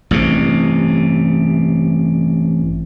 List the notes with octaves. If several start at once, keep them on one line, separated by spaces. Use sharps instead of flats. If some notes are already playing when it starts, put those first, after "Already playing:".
A1 G2 C3